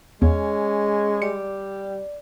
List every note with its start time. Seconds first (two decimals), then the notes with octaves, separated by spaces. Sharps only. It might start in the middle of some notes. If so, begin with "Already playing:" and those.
0.22 E2 G#3 C#4
1.22 G3 D5 C#7